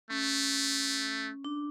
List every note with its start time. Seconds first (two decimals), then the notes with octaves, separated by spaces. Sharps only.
0.10 A3 C#4
1.45 D4